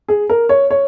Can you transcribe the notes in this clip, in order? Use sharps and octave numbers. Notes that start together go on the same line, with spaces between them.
G#4
A#4
C#5
C#5